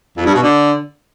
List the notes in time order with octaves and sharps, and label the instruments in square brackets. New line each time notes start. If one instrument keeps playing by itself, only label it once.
[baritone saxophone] F2
G2
B2
D3